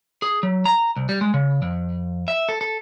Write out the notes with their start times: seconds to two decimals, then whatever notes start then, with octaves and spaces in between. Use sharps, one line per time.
0.22 G#4
0.43 F#3
0.66 A#5
0.96 C2
1.09 G3
1.21 G#3
1.34 C#3
1.62 F2
2.28 E5
2.49 A4
2.61 A4